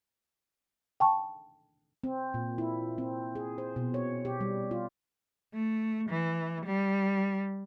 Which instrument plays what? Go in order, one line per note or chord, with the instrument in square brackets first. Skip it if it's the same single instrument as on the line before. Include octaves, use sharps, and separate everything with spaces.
[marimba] G5 A5 C#6
[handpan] C4
A#2
E4
C4
G#4
C5
B2
C#5
G4
G3
F4
[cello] A3
E3
G3